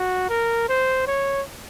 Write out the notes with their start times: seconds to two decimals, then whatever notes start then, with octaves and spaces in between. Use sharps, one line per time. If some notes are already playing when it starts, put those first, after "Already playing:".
Already playing: F#4
0.30 A#4
0.69 C5
1.07 C#5